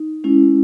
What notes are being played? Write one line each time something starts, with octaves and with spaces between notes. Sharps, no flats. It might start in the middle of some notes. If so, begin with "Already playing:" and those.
Already playing: D#4
G#3 C#4 E4